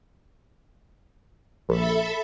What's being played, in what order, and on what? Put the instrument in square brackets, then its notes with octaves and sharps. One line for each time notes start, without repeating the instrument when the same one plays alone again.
[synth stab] A#1 [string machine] A4 E5 B5